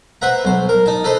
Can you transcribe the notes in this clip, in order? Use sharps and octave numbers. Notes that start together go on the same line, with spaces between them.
B4 C5 E5 F#5 A#5
B1 C5
A#4
D#4 A5
D#4 A4 B4 C5